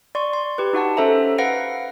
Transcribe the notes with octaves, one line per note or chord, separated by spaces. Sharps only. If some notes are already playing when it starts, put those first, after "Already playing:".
D5 C6 C#6
C6
G4 B4
D#4 F#4 F#5 A5
C#4 A4 C5 E5 A#5
B4 F5 F#5 A#6 D7